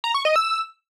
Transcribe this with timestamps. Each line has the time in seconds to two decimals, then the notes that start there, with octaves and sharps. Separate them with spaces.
0.04 A#5
0.14 C#6
0.25 D#5
0.36 E6